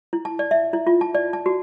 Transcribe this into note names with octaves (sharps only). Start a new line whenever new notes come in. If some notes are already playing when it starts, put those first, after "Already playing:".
E4
A5
D5
E5
E4
F4
A5
D5
A5
F#4